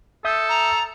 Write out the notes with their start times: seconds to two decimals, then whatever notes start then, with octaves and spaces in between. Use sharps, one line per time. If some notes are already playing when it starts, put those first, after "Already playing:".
0.25 A4 E5 D#6 G6
0.49 A#5